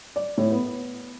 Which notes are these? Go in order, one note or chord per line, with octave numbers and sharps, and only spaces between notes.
D5
A2
B3